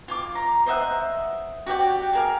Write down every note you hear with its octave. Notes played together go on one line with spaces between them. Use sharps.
F4 G#5 D6
A#5
C5 D#5 E5 F#5
F#4 G4 D5 G5
G#4 A#4 F5